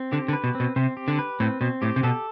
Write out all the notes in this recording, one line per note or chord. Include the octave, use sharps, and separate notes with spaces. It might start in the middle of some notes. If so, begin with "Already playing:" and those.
Already playing: C4
D3 G4
D3
B4
B2
C4
B2
C3 C4
G4
D3
B4
A2 C4
B2 C4
A2 G4
C3
B2 A4